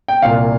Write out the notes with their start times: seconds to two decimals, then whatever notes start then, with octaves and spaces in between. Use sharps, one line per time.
0.08 G5
0.22 C2 A#2 F5